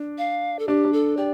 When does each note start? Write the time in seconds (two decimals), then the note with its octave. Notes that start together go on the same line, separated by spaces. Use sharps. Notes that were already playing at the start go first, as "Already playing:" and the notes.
Already playing: D4
0.18 F5
0.59 A4
0.68 D4 G4
0.85 D4
0.93 A4
1.17 G4 D5